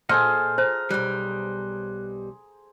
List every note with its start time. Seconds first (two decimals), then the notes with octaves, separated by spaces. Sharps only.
0.09 A#2 G#4 A4 C5 D#5 F#5 F6
0.58 C5 A#5
0.91 B1 G3 F#6